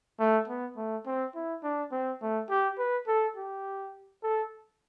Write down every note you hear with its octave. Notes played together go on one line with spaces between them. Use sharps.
A3
B3
A3
C4
E4
D4
C4
A3
G4
B4
A4
G4
A4